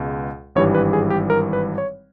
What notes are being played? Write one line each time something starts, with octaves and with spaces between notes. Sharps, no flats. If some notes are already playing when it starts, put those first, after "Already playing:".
Already playing: C#2 B2 G#3
G#1 G2 E3 G3 C#5
B4
G#4
G4
A#4
B4
C#5